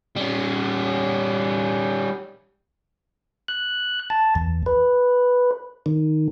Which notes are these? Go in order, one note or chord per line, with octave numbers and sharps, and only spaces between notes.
G3 C#4
F#6
A5
E2
B4
D#3